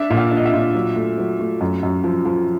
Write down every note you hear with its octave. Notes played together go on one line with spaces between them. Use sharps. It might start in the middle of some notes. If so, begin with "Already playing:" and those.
Already playing: D4 E5
A#2
F5
D4
D#5
E5
A#2
F#3
A3
F#3
A3
F#2
F#2
F3
F3